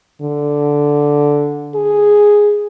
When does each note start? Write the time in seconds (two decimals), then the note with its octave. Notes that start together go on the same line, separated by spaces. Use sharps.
0.21 D3
1.75 G#4